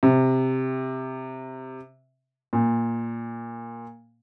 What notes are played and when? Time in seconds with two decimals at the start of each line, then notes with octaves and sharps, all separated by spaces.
0.03 C3
2.53 A#2